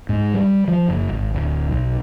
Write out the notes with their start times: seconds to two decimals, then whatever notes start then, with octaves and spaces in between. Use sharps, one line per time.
0.09 G#2
0.34 G3
0.68 F3
0.88 F#1
1.13 G#1
1.34 D1
1.69 B1